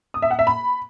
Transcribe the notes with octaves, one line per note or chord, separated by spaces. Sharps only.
D#6
E5
F#5
E5
B5